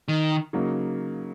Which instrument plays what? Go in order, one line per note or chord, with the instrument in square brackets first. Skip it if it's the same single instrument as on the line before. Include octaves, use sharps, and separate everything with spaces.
[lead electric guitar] D#3
[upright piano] C#3 F#3 A#3 D#4